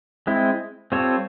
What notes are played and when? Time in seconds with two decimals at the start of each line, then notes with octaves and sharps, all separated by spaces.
0.27 G#3 C4 E4
0.92 G3 C4 F4 A4 C#5